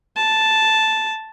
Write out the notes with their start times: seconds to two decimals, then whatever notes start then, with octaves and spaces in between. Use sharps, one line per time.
0.16 A5